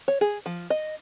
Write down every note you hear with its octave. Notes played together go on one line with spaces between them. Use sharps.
C#5
G#4
F3
D#5